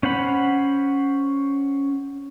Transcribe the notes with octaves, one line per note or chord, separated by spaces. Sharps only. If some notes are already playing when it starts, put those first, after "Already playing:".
C#4 C5 F#5 B5